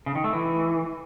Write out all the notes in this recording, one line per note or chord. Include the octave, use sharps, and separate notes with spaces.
C#3
D#3
A3
E3